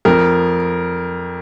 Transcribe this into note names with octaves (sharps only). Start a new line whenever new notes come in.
F2 F3 A#4